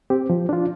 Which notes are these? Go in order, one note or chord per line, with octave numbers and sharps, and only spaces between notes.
C4 G4
F3
D4 F4